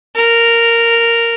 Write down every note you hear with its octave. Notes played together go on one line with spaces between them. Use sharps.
A#4